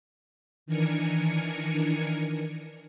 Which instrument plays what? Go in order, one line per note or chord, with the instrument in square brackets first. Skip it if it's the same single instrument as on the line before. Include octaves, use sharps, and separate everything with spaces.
[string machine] D#3 E3 D4 A#4 G#5 C#7